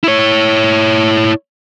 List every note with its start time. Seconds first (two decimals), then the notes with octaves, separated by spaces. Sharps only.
0.04 E4 C#5